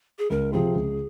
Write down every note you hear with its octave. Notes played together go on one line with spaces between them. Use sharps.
G#4
C#2 A#4
C3 F3 C4 F4 G#4
C#2